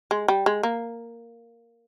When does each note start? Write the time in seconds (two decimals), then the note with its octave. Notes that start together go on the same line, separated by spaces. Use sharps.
0.11 G#3
0.28 G3
0.46 G#3
0.63 A#3